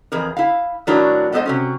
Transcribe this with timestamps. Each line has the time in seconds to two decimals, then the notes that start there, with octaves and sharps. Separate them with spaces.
0.12 F2 E3 G#4 A#4
0.37 E4 F5
0.87 A2 D#3 F#3 D4 E4 A#4
1.32 G#3 A3 B3 A4 C5 D#5
1.46 C3 F#3 C#4